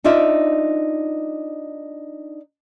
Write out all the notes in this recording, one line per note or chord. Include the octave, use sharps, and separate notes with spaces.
D4 D#4 F4 D5 E5